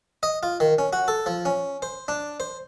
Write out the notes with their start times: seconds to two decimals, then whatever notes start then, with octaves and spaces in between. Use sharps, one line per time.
0.23 D#5
0.43 F4
0.60 D#3
0.78 C#4
0.93 F#4
1.08 A4
1.26 F3
1.45 C#4
1.82 C5
2.08 D4
2.40 C5